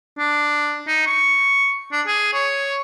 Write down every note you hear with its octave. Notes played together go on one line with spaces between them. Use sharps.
D4
D#4
C#6
D4
G#4
C#5